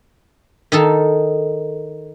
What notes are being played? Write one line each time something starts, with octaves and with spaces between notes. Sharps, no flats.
D#3 D#4 A4